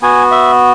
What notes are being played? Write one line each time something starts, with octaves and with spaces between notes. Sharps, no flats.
B3 F#4 G#5
E5